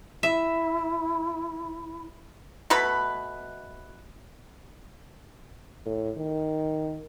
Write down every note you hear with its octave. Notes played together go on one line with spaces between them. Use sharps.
E4 E5
B2 A3 B4 B5
A2
D#3